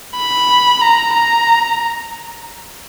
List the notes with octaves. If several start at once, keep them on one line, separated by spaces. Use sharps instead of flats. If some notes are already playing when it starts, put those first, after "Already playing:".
B5
A#5
A#5